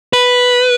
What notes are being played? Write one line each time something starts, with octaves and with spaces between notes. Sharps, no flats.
B4